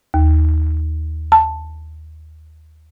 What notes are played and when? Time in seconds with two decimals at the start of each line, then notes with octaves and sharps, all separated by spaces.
0.14 D#2
1.32 A5